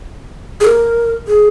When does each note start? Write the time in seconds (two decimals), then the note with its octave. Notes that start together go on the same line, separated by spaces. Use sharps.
0.60 G#4
0.65 A#4
1.27 G#4